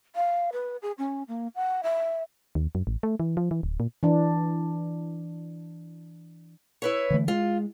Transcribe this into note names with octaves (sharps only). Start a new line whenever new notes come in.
F5
B4
G#4
C#4
A#3
F#5
E5
D#2
F#2
A1
A3
E3
F3
E3
D1
A#2
E3 D4
E4 B4 C#5
D3 E3 A3
G#3 F4